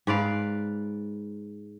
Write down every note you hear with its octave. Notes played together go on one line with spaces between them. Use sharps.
G#2 B4 D5 F5